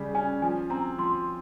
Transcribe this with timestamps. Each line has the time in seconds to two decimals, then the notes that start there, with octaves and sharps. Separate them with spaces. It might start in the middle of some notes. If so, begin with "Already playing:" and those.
Already playing: C#3 G3
0.15 C#4 G#5
0.42 F3 G#5
0.70 C4 A#5
0.98 F3 C6